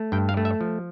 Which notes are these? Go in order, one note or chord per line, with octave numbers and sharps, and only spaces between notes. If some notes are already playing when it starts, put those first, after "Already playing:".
Already playing: A3
G2 G5
F5
A3
E5
F3